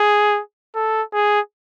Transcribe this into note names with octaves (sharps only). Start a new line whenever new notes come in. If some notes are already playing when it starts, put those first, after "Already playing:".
Already playing: G#4
A4
G#4